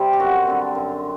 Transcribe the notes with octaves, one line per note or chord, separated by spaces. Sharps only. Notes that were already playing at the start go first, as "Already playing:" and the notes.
Already playing: C3 G3 C4
G4
F#2 F#4
D3 G3 C4
F#2